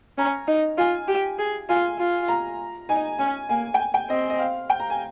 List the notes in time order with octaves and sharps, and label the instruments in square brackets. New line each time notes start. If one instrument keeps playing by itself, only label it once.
[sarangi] C#4 [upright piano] A#5
[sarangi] D#4
[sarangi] F4 [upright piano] G#5
[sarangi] G4
G#4
[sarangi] F4 [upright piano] G#5
[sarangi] F4
[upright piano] A#5
[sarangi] D#4 [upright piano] G#5
[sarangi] C#4 [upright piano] G#5
[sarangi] A#3 [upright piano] G#5
[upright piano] G5
G#5
G5
[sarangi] C4 [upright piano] D#5
[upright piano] D#5
F5
G5
A#5
G#5